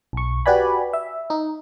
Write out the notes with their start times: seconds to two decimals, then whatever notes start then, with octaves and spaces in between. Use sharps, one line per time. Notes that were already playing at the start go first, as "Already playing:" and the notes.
0.13 B1 C#6
0.46 F#4 G4 B4 D5 G#5 B5
0.93 E5
1.30 D#4